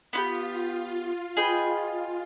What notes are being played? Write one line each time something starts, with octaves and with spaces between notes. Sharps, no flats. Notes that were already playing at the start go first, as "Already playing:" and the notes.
B3 E4 F4 G4
F4
G#4 B4 D#5 G5